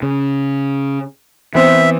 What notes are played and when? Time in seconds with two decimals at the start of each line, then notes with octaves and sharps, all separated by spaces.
0.02 C#3
1.55 E3 B3 C4 C5 E5